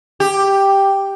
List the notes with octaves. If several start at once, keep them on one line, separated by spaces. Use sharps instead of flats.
G4